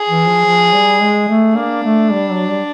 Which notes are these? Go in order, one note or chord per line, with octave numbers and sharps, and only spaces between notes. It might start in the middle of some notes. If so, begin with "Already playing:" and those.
Already playing: G#4
E3
F3
F3
G3
G#3
A3
A#3 D4
A3
G3
F#3
G3